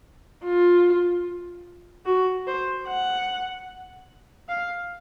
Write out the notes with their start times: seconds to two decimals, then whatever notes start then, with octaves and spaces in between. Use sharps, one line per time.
0.44 F4
2.06 F#4
2.47 C5
2.87 F#5
4.49 F5